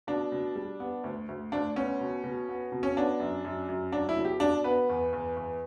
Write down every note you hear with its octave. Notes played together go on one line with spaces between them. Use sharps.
B2 D4
B2
G3
B3
D2
D2
D2 D4
B3 C#4
B2
B2
B3
B2
C#4
B3 D4
F#2
F#2
F#2
F#3 D4
E4
B2
G4
B2 D4
B3 B4
E2
E2
E2